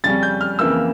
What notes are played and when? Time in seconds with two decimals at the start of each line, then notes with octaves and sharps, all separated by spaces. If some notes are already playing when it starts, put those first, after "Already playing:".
0.04 F2 C#3 G3 C#4 A6
0.23 G6
0.41 F6
0.59 F2 C#3 E3 A#3 E6